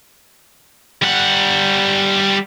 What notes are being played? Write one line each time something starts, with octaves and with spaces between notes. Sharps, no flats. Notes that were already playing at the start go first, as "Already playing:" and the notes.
G3 F#5